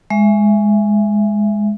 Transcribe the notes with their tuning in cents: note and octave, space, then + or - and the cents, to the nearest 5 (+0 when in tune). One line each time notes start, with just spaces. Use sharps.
G#3 +0 E5 +20